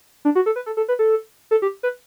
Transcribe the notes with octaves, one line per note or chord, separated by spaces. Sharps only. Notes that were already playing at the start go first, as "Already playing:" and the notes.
D4
F#4
A4
B4
A4
A4
B4
A4
A4
G4
B4